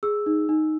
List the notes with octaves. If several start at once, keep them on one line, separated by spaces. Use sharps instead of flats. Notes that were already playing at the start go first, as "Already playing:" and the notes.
G#4 E6
D#4
D#4